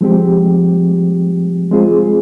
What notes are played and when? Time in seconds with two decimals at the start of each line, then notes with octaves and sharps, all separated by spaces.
0.01 F3 G#3 C4 G4
1.71 G#3 C4 F4 G#4